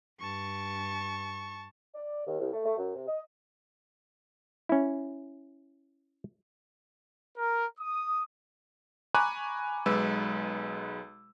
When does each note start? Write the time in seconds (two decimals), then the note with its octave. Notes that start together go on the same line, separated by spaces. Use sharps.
0.20 G2 A5 C#6
1.94 D5
2.27 D#2
2.39 C2
2.53 A3
2.65 A3
2.77 F#2
2.94 C3
3.07 D#5
4.69 C#4 E4
7.37 A#4
7.79 D#6
9.15 G#5 A#5 B5 C#6 D6 F#6
9.86 B1 G#3 B4 E6